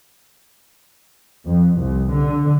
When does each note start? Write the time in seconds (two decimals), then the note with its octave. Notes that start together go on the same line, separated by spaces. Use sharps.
1.47 F2
1.81 C2
2.14 D3